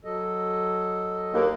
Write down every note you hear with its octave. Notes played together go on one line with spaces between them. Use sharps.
F#3 A4 D#5
D#2 D#3 A#3